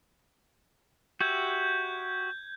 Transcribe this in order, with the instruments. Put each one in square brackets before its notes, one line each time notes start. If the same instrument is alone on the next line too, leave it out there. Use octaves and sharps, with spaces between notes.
[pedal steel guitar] F#4 G4 E5 [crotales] G6 G#6